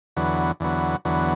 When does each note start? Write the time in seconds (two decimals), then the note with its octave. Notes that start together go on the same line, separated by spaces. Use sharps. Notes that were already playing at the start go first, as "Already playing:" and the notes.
0.16 E2 D3 F#3 B3
0.60 E2 D3 F#3 B3
1.05 E2 D3 F#3 B3